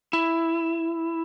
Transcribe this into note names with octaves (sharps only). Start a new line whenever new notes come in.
E4